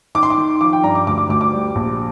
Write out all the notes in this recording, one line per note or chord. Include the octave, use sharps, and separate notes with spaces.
D#3 D6
C6
D6
D#3
F3 D6
G5
G2 A#5
D6
D2 D6
D6
D2 D6
D6
G3
A#1